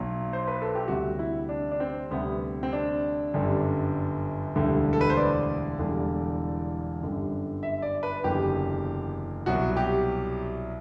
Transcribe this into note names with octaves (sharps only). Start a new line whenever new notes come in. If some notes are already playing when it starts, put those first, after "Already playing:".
Already playing: B1 B2 F#3
C5
B4
A4
G4
D2 C3 G3 F#4
E4
D4
D4
C4
D2 C3 G3 B3
C4
D4
G1 F#2 D3 G3
E1 D2 D3 G3
A4
B4
C5
D5
E1 E2 D3 G3
G1 F#2 D3 G3
E5
D5
B4
F#1 E2 D3 F#3 G4
C2 B2 F#3 F#4
G4